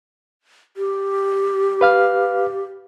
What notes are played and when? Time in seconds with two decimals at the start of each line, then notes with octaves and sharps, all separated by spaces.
0.77 G4
1.81 B4 F5 F6